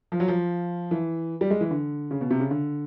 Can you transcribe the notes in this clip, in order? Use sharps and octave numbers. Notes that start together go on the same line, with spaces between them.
F3
F#3
F3
E3
G3
G#3
E3
D3
C#3
B2
C3
C#3
D3